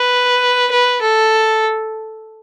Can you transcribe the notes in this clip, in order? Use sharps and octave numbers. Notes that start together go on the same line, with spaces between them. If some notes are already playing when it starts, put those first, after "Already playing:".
Already playing: B4
B4
A4